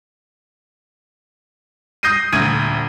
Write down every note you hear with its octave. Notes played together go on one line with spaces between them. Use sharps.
D#6 G6 A#6 C7 D#7
D#1 D2 G#6 D#7